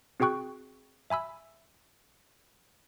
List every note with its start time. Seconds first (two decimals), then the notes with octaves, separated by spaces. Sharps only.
0.20 C4 F#4 G#4 G5 C#6 F#6
1.10 E5 G#5 B5 E6